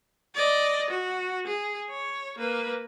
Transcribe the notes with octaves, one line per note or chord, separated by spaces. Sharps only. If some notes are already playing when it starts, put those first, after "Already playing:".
D5 D#5
F#4
G#4
C#5
A#3 B4